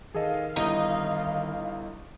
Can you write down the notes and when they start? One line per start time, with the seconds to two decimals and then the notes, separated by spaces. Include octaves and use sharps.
0.15 D#3 G#4 A4 D#5 F5
0.56 G1 G3 D#4 E4